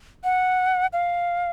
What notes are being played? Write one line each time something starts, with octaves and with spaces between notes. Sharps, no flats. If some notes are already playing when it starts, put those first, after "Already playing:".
F#5
F5